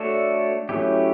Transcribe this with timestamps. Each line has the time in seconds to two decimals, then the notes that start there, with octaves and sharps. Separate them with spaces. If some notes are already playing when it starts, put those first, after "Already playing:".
Already playing: A3 D4 F#4 A4 C#5
0.69 F#3 A3 C#4 E4 G4